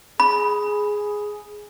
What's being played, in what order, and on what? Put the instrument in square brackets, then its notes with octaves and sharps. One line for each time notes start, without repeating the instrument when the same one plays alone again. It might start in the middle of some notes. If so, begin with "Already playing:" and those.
[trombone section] G#4 [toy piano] B5